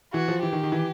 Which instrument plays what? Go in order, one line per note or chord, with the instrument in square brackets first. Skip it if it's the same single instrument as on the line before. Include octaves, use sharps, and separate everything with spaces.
[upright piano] E3 [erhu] F#4
[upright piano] F3
[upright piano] E3 [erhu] G4
[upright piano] D#3
D#3
E3